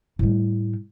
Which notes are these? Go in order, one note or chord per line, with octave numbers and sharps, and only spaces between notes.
A2 G3